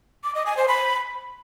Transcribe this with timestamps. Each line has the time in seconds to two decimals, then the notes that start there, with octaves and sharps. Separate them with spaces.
0.24 D6
0.35 D#5
0.46 G#5
0.57 C5
0.68 B5